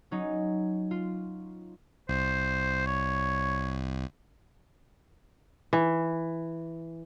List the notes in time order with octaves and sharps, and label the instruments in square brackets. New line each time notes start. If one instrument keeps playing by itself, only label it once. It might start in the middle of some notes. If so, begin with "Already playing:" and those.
[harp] F#3 C#4 D#4
F4
[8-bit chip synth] C2 [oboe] C5
[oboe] C#5
[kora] E3